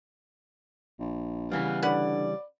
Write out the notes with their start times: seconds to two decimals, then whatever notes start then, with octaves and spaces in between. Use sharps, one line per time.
1.00 A#1
1.52 C#3 E3 G3 B3 B4 F5
1.82 D3 C#4 B4 D5 F#5